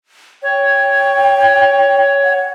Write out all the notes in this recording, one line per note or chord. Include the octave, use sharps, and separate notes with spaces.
C#5 G5
F#5